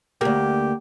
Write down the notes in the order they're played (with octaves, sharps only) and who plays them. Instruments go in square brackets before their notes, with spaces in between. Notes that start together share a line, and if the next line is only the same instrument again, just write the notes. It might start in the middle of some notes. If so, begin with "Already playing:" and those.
[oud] D2 A#3 [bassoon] G4